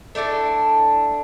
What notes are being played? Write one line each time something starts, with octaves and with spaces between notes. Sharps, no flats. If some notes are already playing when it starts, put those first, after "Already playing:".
A3 D4 E4 A4